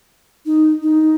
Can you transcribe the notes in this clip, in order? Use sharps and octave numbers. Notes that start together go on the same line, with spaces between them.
D#4
D#4